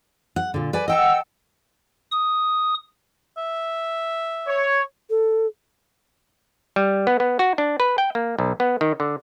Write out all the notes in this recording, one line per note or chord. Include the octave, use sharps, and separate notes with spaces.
F#5
A#2 D3
B4 D5 G#5
D#5 F#5 G5 A5 E6
D#6
E5
C#5
A4
G3
B3
B3
F#4
D4
B4
G5
A#3
B1
B3
D#3
D3